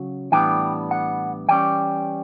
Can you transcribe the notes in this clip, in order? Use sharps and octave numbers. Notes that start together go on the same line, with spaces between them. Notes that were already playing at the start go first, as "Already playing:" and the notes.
Already playing: C#3 F#3 C#4
A2 E3 G3 B3 D4 G5
F#5
E3 G3 C#4 G5